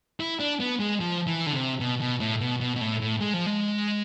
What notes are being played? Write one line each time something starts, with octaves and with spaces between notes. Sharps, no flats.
E4
D4
B3
G#3
F3
E3
D3
C3
B2
B2
A2
B2
B2
B2
A2
A2
G#3
F3
G#3